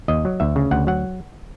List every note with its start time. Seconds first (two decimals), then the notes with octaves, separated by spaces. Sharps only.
0.08 D#2 D#5
0.25 F#3
0.40 D2 E5
0.56 C#3
0.71 D2 F#5
0.87 F#3 F#5